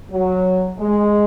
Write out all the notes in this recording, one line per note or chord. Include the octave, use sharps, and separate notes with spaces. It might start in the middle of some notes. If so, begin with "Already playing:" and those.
F#3
G#3